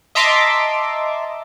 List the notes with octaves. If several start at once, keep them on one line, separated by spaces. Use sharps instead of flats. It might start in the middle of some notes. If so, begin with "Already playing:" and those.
D#5 E5 A5 A#5 C6 D6